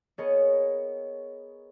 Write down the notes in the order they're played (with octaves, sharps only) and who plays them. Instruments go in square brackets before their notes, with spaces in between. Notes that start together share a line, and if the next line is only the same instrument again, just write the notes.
[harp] B3 G#4 A#4 C#5 D#5